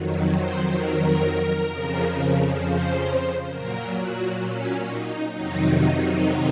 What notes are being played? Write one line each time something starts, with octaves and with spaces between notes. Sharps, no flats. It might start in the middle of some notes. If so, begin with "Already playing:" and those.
Already playing: F2 D#3 F#3
C5
A#4
F2 C#3 F3
C5
A#2 F#3 A#4
F#4
C#4
D#4
F2 C3 D#3 F#3 D#4